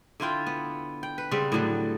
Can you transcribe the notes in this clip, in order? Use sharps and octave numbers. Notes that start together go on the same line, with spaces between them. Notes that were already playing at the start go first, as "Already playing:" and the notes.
D3 E4 F4 G5
B3
G5
B4
C#3 G3 B3 C4
A2 D3 F#3 G3